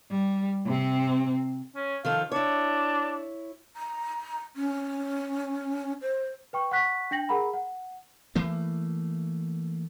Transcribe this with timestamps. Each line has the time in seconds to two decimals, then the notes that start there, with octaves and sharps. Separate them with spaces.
0.11 G3
0.66 C3 C4
1.76 C#4
2.05 D#3 F3 A4 F5
2.32 D4 E4 C#5
3.76 A#5
4.56 C#4
6.02 C5
6.53 B4 G5 C#6
6.71 F#5 C#6 F#6 B6
7.11 D4 G5 A#6 F#7
7.29 G#4 A#4 F#5 A#5 B5
7.53 F#5
8.36 E3 A3 A#3